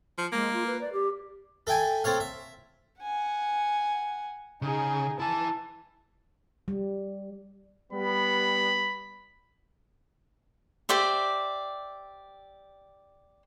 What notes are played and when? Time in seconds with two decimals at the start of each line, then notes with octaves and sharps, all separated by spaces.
0.18 F3
0.32 G#3 A#3
0.53 F4
0.67 B4
0.81 D5
0.93 G4
1.67 A4 E5 G5 G#5
2.04 C4 A4 C#5 F5
2.20 E5
3.00 F#5 G#5
4.62 C#3 D#4 G#4
5.20 E4 G#5 A5
6.68 G3
7.92 G3 B3 B5
10.89 G4 C5 D5 E5